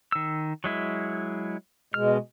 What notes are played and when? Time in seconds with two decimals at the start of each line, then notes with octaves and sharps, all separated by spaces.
0.12 D#3 E6
0.64 F#3 G#3 E4
1.94 B2 G#3 F6